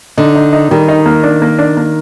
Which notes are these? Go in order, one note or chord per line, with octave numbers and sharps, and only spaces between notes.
D3 D#4
D#4
D#4
D#3 G3
D#4
A#3
D4
A#3
D4
A#3